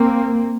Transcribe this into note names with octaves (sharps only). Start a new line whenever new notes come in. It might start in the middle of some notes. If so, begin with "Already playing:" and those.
Already playing: A#3 C4